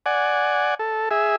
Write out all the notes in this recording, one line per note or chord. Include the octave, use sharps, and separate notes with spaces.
D5 F#5 G#5
A4
G#4 E5